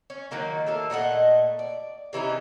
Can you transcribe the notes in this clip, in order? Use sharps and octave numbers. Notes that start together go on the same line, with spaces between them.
C#4
D#3 F#3 A#3 D#4
A3 A#3 A4
A#2 A3 D#5 F#5
D5
C3 E3 C#4 D#4